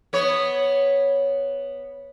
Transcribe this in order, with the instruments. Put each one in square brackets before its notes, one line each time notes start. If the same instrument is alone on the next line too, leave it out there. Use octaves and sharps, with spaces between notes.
[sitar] B3 C#5